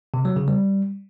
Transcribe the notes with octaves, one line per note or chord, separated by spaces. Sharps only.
C3
F#3
C#3
G3